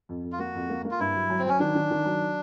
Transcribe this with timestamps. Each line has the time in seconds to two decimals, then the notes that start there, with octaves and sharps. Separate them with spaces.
0.09 F2
0.24 F2
0.32 F4
0.39 A#3 F#4
0.55 F2
0.69 A#3
0.85 A#3
0.91 F4
1.00 G2 E4
1.15 F#3
1.30 F#3
1.39 C4
1.45 F#3 C#4
1.60 D#3 D4
1.76 D#3
1.91 D#3
2.05 F#3